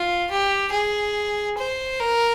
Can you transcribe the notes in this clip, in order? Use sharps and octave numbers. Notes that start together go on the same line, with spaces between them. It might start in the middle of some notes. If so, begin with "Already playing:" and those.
Already playing: F4
G4
G#4
C5
A#4